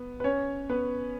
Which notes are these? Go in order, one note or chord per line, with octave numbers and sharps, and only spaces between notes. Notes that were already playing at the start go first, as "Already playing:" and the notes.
Already playing: B3
B4
C#4 C#5
B3 B4